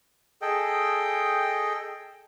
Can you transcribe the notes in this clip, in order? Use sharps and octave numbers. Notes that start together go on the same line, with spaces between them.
G#4 A4 D#5 G5